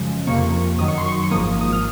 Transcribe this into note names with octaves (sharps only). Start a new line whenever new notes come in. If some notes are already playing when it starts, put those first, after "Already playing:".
Already playing: F#2 C#3 F3 G#3
F2 C3 F3 A#3 C#6
F#2 D#3 F#3 D#6
C#6
C6
C#6
C#6
G#1 G#2 F3 A#3 D#6
D#6
F6